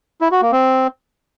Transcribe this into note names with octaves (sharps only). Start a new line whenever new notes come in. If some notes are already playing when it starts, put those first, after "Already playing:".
E4
F#4
A#3
C4